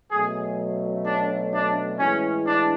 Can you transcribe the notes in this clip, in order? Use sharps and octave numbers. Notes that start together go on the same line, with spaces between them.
B2 F#3 A3 C#4 G#4
D4
D4
A2 E3 G#3 C#4
D4